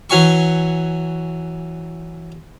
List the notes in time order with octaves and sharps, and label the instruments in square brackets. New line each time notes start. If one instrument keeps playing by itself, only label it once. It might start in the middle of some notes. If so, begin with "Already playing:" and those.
[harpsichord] E3 F#3 G#5 C#6